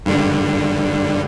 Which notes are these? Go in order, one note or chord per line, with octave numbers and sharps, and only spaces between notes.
G2 D3